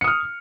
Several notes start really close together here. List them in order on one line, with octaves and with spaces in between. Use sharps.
C#7 D#6 F6